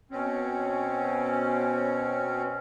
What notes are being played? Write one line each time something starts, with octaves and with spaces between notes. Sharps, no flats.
B2 C4 C#4